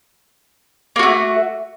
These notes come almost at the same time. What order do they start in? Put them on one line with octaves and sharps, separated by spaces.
A#3 F#4 A3